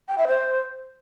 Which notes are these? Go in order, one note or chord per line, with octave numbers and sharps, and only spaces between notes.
G5
E5
C5